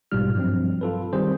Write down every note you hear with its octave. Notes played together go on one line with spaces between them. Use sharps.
A#1 G#2 B2 G3 F4 F6
G2 F3 F#3 C4
F4 A4 B4
D#3 G3 C4 G#4 C5